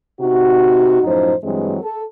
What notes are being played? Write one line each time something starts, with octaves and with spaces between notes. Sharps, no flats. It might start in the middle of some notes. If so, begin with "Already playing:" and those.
C3 D#4 F#4
F#2 A2 F3 D#4 C5
G2 E3 F#3 G#3 C4
A4